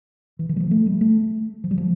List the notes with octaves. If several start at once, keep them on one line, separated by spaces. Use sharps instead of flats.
E3
E3
G3
F3
A3
G3
A3
F3
G3
F3